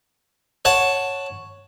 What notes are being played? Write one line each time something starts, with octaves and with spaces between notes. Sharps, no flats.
C#5 F#5 A5